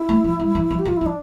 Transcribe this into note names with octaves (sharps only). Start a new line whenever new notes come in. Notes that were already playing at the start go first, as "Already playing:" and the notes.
Already playing: E4
A3
F3
G3
E3
F3
G4
F3
F4
F3 E4
D4